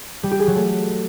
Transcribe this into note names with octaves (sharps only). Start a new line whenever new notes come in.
G3
G4
G#4
F#3
A3